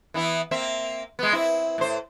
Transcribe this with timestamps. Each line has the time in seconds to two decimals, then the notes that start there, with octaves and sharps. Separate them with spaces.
0.14 E3 B3 E4
0.51 A#3 C4 E5
1.19 G#3 B3
1.33 C4 E4
1.78 A2 C5